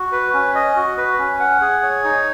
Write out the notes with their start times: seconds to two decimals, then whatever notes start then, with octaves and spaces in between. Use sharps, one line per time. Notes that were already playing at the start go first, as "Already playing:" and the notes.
Already playing: F#4
0.12 B4
0.34 C#4
0.55 D#5
0.76 F#4
0.97 B4
1.19 C#4
1.40 F#5
1.61 G#4
1.83 C#5
2.04 D#4